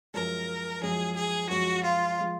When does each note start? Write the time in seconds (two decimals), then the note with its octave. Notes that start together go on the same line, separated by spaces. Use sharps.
0.14 F#2 F3 G#3 A#4
0.81 F#2 F3 G#3 G#4
1.15 G#4
1.49 F#2 F3 G#3 F#4
1.83 F4
2.19 F3 G#3